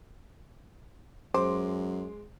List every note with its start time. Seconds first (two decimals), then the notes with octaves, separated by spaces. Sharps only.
1.34 F#2 G#3 C5 C6 D6